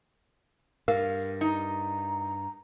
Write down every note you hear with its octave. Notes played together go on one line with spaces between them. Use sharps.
G2 A#4 F5
D#4 A#5